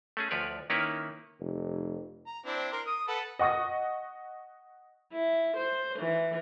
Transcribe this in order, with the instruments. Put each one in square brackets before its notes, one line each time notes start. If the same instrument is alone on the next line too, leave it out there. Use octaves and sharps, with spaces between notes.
[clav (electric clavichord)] A3 C#4 G#4
D2 F3 B4 C#5 D5
D#3 A#3 C#4 E4 B4 C#5
[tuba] F1
[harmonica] A#5
C4 D4 E4
A#4 C6
D#6
A4 B4 F#5
[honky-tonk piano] D#5 F#5 C#6 D#6 A#6
[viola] E4
C5
E3